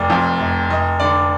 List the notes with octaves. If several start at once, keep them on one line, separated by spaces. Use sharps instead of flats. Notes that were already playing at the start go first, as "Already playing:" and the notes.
Already playing: F1 D5
F2
F1
F1 D#5
D3 D5